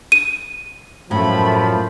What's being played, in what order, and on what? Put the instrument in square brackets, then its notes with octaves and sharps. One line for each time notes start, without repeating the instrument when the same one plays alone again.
[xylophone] D#7
[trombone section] F#2 F3 [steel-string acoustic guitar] A2 [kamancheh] A3 B5